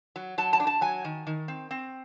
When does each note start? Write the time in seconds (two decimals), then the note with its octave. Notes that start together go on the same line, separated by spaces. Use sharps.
0.16 F#3
0.38 F#3 A5
0.53 A5
0.60 D4
0.67 A5
0.81 F#3 G#5
1.05 D#3
1.27 D#3
1.48 C4
1.71 C4